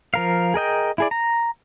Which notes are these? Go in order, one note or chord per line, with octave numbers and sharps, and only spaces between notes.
F3 A#4 F5
G#4 A#4 D#5 G5
E4 G#4 D5
A#5